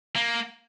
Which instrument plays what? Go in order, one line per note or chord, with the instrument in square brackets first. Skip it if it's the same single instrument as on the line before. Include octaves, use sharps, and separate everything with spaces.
[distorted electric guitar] A#3